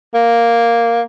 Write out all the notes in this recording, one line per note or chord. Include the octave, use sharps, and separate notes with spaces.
A#3